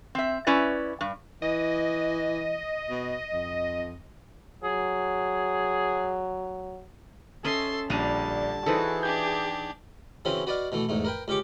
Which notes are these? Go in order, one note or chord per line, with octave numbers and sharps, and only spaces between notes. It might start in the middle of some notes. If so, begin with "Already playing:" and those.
C4 E5
C#4 E4 B4 D5
G2
E3 D#5
B2
F2
F#3 G#4
C#4 A4 D#5 E5 C6
A#1 D3 G3 D4 A5 A#5 D#7
E3 D#4 F#4 G#4 A4 C5
D4 G4 G6
C#3 E3 C4 C#4 F#4 B4
F#4 B4 D5 D#5 F5
B2 E3 A3
E2 G#2 A3
A#4 B4 G5
C#2 C#4 G4 C#6 D6